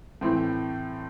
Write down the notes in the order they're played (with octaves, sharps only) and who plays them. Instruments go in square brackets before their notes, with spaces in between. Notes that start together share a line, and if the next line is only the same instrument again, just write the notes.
[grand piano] A2 E3 A3 C4